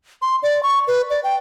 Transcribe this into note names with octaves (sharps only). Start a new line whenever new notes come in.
C6
D5
C#6
B4
D5
G5